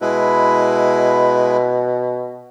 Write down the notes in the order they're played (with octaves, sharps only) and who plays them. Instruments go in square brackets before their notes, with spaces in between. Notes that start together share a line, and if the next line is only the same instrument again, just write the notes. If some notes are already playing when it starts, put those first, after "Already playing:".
[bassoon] B2 [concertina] G#3 E4 B4